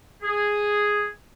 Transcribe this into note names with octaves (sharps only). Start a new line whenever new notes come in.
G#4